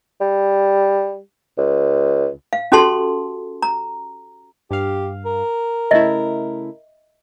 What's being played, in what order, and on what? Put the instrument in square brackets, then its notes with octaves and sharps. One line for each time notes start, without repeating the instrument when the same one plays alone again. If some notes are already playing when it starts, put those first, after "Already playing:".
[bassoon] G3
C#2
[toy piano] F5
C#4 F#4 G4 A4 A5 C6
A#5
[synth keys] G2 F5 [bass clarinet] G4
[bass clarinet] A#4
[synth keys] C#3 A3 E4 [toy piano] D#5 E5